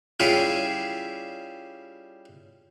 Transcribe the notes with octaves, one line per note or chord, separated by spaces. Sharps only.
G3 C#4 E4 F4 G#4